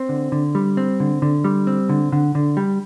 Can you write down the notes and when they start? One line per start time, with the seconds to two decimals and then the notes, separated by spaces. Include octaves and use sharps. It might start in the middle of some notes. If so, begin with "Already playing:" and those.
Already playing: C4
0.09 D3
0.32 D3
0.55 G3
0.77 C4
1.00 D3
1.22 D3
1.44 G3
1.67 C4
1.90 D3
2.12 D3
2.35 D3
2.57 G3